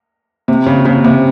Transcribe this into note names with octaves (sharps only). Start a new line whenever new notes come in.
C3
C#3
C#3
C3